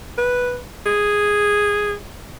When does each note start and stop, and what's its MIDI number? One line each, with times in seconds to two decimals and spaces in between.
0.18 0.59 71
0.86 1.94 68